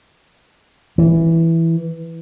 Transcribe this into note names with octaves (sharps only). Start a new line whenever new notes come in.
E3